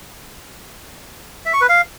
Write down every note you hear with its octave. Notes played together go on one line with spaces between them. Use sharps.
E5
C#6
B4
F5